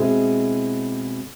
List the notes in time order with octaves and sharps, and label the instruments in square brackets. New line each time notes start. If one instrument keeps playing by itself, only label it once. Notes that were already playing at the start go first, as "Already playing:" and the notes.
Already playing: [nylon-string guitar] B2 G#3 C4 E4 G#4